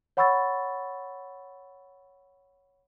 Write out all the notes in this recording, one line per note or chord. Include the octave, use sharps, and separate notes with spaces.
C#5 F#5 B5 C#6 E6 A6